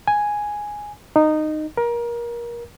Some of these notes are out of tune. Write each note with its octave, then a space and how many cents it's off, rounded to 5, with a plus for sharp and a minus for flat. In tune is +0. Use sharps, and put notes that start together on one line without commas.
G#5 +0
D#4 -15
A#4 +25